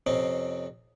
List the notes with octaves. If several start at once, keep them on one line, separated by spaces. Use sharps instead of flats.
F2 C3 C4 C#4 D#4